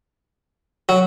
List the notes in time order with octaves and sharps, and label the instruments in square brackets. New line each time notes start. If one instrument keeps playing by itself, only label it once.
[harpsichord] F#3